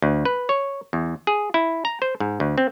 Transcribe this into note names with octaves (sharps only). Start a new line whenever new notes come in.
D2
B4
C#5
E2
G#4
E4
A#5
C5
G#2
D2
C4